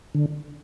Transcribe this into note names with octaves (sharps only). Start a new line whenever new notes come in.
D3